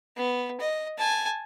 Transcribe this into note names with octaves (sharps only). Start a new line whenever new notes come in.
B3
D#5
G#5 A5